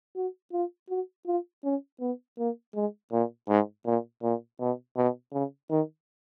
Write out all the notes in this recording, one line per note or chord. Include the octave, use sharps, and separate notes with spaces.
F#4
F4
F#4
F4
C#4
B3
A#3
G#3
A#2
G#2
A#2
A#2
B2
B2
C#3
D#3